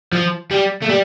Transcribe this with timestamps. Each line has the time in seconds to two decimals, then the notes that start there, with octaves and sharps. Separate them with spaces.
0.13 F3
0.51 G3
0.82 A3
0.89 G3